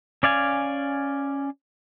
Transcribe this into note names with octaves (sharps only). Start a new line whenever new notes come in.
C#4 D5 F5 G#5